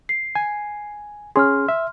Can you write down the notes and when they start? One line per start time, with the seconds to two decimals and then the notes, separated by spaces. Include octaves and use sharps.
0.09 C7
0.35 G#5
1.36 C#4 G#4 C6 F6
1.69 E5